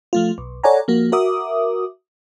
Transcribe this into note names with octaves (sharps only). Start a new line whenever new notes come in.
F3 A3 F4
B1
A4 C#5 D5 F#5 G#5 A#5
F3 A#3 F#4
F#4 A#4 E5 D6 D#6